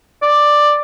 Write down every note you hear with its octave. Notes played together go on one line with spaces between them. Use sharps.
D5